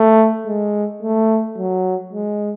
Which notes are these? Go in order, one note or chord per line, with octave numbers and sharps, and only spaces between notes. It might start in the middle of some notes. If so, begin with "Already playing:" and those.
Already playing: A3
G#3
A3
F#3
G#3